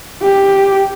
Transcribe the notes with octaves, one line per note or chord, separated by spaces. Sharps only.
G4